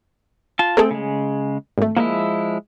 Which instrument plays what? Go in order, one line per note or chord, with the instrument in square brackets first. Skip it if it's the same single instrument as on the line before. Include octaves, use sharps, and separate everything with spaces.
[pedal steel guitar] F4 A5
[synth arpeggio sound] A3 G#4 A4 [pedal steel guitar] C4
[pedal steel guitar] C#3 G#3
[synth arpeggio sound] G#1 A3
[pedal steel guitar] F3 G#3 E4 [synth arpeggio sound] A#3